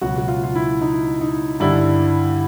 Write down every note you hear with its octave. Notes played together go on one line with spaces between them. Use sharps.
C#2 B2 F#3 F#4
F#4
F4
F4
E4
D#4
D#4
G2 D3 G3 E4